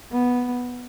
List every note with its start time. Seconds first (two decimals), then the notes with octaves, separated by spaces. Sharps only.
0.12 B3